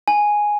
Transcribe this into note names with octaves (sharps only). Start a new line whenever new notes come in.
G#5